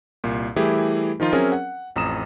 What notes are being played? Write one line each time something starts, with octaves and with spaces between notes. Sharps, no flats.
C2 A#2
E3 G3 A3 E4 G4 G#4
D#3 F3 D#4 F4
F#3 C4 C#4 G#4 A#4 E5
F#5
A1 F2 A#5 D#6 E7